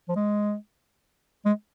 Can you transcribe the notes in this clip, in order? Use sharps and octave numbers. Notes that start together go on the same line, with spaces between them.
F3
G#3
G#3